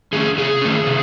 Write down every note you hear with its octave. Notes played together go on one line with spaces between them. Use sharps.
D#3 A3 C#4 G#4
C3 G#4
D#3 A3 C#4
C3